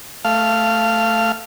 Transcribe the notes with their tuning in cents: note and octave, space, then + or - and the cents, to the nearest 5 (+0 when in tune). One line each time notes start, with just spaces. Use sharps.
A3 +0 F5 -15